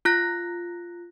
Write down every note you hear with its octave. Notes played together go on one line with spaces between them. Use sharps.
F4 F#6 A#6